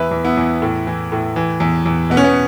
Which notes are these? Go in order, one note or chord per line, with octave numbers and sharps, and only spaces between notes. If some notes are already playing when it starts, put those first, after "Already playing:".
Already playing: E2 B4 E5
E2
B3 E4
E2
A2
E3
A2
E3
E2
E2
B2 B3
C#4
B3